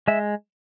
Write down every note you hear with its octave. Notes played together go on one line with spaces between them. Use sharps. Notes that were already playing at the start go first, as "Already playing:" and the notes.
G#3 E5